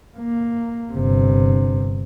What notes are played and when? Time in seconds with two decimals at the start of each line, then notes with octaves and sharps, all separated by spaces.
0.18 A#3
0.93 G1 C3